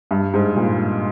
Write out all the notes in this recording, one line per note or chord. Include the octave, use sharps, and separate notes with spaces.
G2
G#2
A#2